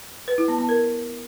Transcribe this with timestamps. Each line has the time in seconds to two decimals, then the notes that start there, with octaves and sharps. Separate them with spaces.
0.28 B4
0.38 E4
0.48 B3
0.59 B3
0.69 A#4